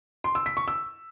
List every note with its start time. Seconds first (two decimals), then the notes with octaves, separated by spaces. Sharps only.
0.24 C6
0.35 E6
0.46 B6
0.57 C#6
0.68 E6